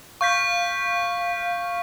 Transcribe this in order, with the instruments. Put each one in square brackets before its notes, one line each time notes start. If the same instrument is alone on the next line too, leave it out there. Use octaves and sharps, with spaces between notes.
[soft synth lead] F5 [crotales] C#6 G6 B6